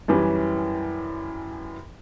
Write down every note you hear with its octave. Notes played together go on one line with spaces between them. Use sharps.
F#2 E3 G3 C#4